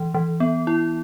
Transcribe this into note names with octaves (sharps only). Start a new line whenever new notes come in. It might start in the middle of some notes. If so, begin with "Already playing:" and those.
Already playing: E3
E3
B3
E4